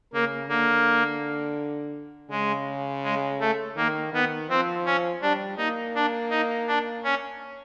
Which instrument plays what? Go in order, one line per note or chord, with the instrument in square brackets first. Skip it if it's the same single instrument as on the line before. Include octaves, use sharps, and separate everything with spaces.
[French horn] C#3 [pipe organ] A#3
[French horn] D3 [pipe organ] A#3
[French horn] C#3 [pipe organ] G#3
[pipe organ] G#3
A3
[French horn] D#3 [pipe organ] A#3
[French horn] D#3 [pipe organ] B3
[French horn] F3 [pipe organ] C4
[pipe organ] C#4
[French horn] G3 [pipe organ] D4
[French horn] A#3 [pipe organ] D#4
[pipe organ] D4
D#4
D4
C#4